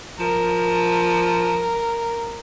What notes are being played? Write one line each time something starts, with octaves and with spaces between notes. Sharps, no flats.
F3 A#4